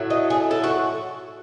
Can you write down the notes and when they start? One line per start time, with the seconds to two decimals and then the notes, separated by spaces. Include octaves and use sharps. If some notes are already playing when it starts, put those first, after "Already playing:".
Already playing: A2 F#3 A3
0.10 D#5
0.30 G#4
0.51 A4
0.64 F#4